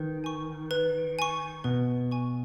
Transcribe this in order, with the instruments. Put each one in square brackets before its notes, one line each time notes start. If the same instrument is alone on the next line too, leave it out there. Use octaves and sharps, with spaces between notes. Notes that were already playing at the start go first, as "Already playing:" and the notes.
Already playing: [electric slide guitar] D#3 [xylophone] B4
[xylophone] G#5 C#6
B4
G#5 C#6
[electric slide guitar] B2 [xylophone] B4
[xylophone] G#5 C#6